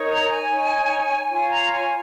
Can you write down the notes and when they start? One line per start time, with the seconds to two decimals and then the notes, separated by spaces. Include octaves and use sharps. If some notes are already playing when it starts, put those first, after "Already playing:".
Already playing: D#4 A#4 C#5
0.10 A#5
0.30 G#5
0.50 D#4 C#5
1.30 F4 C#5 G#5
1.51 A#5
1.70 G#5